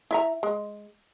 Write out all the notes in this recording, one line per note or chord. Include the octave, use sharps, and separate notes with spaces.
E4 E5 A#5
G#3